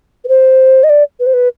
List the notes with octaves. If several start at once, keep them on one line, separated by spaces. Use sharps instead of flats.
B4
C5
D#5
D5
B4
C5
B4